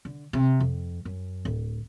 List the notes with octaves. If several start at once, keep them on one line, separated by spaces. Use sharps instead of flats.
D3
C3
F2
F#2
D1